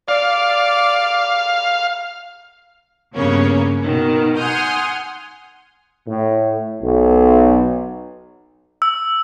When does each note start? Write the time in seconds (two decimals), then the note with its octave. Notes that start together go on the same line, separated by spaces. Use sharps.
0.08 D5 F5
3.14 G2 C#3 A#3 B3 C#4 C#5
3.82 B2 D#3
4.36 F#5 G#5 C6 D#6 F6 G6
6.06 A2
6.82 B1
8.82 E6